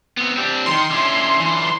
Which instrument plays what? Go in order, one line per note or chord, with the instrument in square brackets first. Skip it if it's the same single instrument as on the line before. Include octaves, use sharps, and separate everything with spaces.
[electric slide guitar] B3 C4
C4 D4 G4
[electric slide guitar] D#3 E3 [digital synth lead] C6
[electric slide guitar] D3 C#4 E4
D3 E3